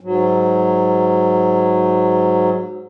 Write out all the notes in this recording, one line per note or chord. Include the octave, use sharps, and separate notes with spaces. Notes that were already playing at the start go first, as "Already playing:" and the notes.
G#2 F#3